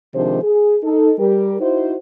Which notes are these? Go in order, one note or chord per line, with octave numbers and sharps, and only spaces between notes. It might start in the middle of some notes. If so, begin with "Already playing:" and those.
C3 D#3 F3 G#3 D4 C5
G#4
D#4 A4
G3 G4 A#4
D#4 E4 F#4 C5